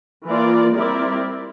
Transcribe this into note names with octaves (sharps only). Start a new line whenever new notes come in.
E3 A#3 F4 A#4 D5
G3 C4 E4 A#4 D5